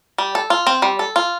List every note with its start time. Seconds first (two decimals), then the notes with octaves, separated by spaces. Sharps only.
0.18 G3
0.35 A4
0.50 F4
0.67 C4
0.82 G3
0.99 A4
1.16 F4